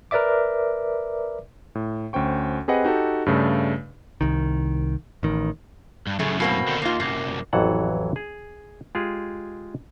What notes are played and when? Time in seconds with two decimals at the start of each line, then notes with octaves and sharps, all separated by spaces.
0.11 A#4 B4 D5 E5 D6
1.75 A2
2.13 D2 C#4 C5 G5 C#6
2.68 C4 G4 G#4 B4 D#5 F#5
2.85 D#4 F#4 G4 A4
3.26 G2 C#3 A3 D4
4.21 C2 D#3
5.23 A1 D#3
6.07 G2
6.19 F#2 A2 C#3 A3
6.40 B2 A#3 C4
6.68 D3 D#3
6.82 D#2 A#3 F4
7.00 C2 F#2 A#3
7.53 A1 F2 E3 F#3 A4 F#5
8.16 G#4
8.95 G#3 F4 G4 G#4